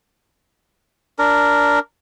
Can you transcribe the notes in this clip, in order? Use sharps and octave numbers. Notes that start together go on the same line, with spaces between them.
D4 A#4